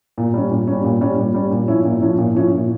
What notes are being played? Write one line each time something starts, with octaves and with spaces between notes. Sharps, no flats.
A#2
G3 C#4
A#2
G3 C#4
A#2
G3 C#4
A#2
G3 C#4
A#2
F3 C#4 E4
A#2
F3 C#4 E4
A#2
F3 C#4 E4
A#2